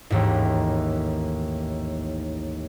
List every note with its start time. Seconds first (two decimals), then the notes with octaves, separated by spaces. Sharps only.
0.10 A1 D#2 G#2